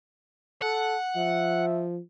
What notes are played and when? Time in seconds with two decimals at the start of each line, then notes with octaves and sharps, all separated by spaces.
0.62 A4 F#5
1.16 F3 E5